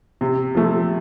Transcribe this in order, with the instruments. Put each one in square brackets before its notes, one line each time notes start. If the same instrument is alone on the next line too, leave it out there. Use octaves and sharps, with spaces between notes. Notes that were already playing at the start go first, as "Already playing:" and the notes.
[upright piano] C3
F3 A3